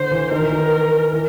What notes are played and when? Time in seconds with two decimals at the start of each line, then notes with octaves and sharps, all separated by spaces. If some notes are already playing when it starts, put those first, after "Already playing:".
Already playing: D3 C5
0.11 E3
0.31 D#3 A#4
0.42 E3
0.52 D#3
1.13 E3